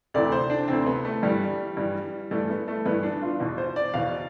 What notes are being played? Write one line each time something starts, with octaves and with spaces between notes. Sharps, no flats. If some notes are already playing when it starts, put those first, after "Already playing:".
D2 C3 E3 D5
C5
D4
D2 C3 E3 C4
B3
A3
G2 E3 G3
G2 E3
G2 E3 A3
B3
A3
G2 E3 B3
D4
F4
E2 B2
C5
D5
E2 B2 F5